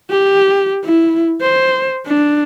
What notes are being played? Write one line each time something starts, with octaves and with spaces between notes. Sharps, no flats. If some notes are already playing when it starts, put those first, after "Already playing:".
G4
E4
C5
D4